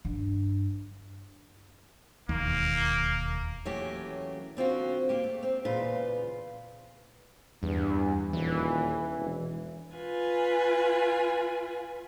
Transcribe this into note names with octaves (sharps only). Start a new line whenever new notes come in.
G2
E1 D#2 A#3
E3 F#3 A3 A#3 C#4 G4
D3 C4 F4 F#4
A#3 G4
A3
C4
E2 A#2 C#3 F4 B4
E2 G2
D#1 E3
E1
F4 B4 G#5